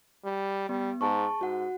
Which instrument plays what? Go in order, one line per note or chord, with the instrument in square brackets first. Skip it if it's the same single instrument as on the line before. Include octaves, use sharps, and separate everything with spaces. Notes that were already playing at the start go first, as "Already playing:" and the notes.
[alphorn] G3
[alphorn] G3 [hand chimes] B3
[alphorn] G#2 [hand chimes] G#4 A5 C#6
[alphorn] G#2 [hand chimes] F#4 F#5